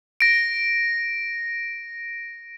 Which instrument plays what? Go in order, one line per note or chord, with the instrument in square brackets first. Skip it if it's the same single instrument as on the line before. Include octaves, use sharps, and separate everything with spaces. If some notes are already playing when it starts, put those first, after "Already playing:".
[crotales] A#6 D7